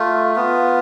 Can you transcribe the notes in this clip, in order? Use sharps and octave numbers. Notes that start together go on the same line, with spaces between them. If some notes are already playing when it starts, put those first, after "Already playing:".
Already playing: A3 F4
B3 F4